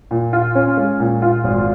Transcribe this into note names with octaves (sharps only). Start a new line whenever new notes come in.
A#2
F4
C#4
G#3
A#2
F4
G#1